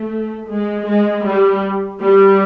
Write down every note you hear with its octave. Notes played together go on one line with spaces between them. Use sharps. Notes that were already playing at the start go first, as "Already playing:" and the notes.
Already playing: A3
G#3
G#3
G3
G3